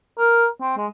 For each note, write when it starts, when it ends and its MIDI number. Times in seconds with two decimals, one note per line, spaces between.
0.19 0.46 70
0.61 0.73 60
0.77 0.87 56